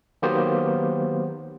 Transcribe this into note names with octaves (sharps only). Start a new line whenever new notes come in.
D#3 F#3 A#3 B3 G4 C5